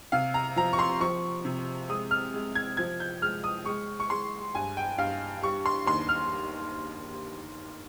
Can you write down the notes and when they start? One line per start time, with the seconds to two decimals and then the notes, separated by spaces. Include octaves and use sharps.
0.12 C3 F5
0.34 A#5
0.56 F3 A#5
0.73 C#6
0.79 C6
1.00 F3 C#6
1.45 C3
1.89 G#3 D#6
2.11 F6
2.34 G#3
2.55 G#6
2.77 F3 G#6
3.00 G6
3.22 G#3 F6
3.44 D#6
3.66 G#3 C#6
4.00 C#6
4.10 G#3 C6
4.55 G2 G#5
4.77 G5
4.98 G2 F5
5.42 G3 C#6
5.66 C6
5.86 D#2 C6
6.09 F6